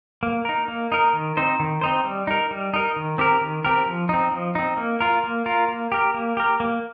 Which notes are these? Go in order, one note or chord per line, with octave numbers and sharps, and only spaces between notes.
A#3
D#4 A#4
A#3
D#4 A#4
D#3
C4 D#4 C5
D#3
C4 D#4 C5
G3
D#4 A#4
G3
D#4 A#4
D#3
C4 G4 A#4
D#3
C4 G4 A#4
F3
C4 D#4
F3
C4 D#4
A#3
F4 A#4
A#3
F4 A#4
A#3
G4 A#4
A#3
G4 A#4
A#3